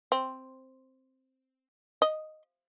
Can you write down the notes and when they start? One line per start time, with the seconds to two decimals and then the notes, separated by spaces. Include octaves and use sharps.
0.12 C4
2.02 D#5